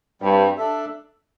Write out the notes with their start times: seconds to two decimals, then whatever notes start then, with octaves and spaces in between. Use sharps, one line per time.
0.21 G2 G3 C4 G4
0.57 D4 A4 E5